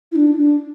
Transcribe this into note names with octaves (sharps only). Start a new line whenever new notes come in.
E4
D4
E4
D4